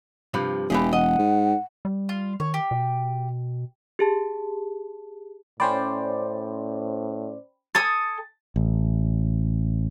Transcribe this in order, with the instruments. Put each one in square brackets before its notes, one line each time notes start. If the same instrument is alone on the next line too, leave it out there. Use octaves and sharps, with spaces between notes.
[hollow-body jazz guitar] G2 C3 F3
[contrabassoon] E1 [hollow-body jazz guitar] E3 G4 G#4
[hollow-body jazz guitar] D#5 [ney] F#5
[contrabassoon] G#2
[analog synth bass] G3
[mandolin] F4
[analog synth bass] D#3 [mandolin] C#5
[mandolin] G4
[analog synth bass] B2
[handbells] G4 G#4 A5
[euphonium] A2 [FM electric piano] C#4 C5 D5 [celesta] G5 B5
[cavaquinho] A4 G#5 D#6 [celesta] A6
[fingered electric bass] A1